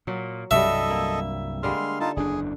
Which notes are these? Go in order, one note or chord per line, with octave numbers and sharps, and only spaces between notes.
A#2 F#3
C2 G2 F#3 G3 F#4 A4 D#5 E5
A#3
D3 G3 G#3 A#3 C6 F6
D#4 F4 A4 A5
F#1 E2 D4 G#4